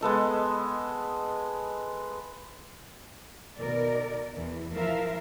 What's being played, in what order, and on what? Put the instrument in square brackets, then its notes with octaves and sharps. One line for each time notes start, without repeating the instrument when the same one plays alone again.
[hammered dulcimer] G#3 B3 A4 D#5
[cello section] B2 D#3 A#4 D5
E2 E3
E3 F3 A#4 E5 F5